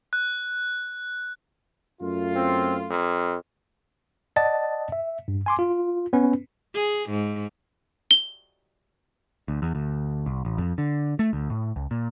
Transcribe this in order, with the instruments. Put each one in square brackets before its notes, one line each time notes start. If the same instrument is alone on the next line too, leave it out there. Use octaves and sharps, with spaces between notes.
[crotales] F#6
[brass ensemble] F#2 A3 F4
[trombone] C4
F2
[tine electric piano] D5 D#5 F#5 A5 A6
E5
G2
G#5 C6 D6
F4
B3 C#4 B4
[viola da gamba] G#4
G#2
[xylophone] G7
[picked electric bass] D2
E2
D2
C2
A1
F2
D3
A3
D2
A2
C#2
A#2